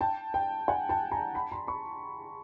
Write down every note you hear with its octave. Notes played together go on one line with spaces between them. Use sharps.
G5 A5
G5
F#5 G#5
G5 A5
G#5 A#5
A5 B5
A#5 C6
B5 C#6